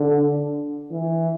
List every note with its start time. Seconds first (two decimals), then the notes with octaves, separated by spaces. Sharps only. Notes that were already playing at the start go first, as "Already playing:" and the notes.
Already playing: D3
0.91 E3